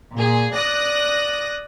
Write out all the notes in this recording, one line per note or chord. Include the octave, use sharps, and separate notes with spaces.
A#2 G#4
D5 D#6 F#6 A#6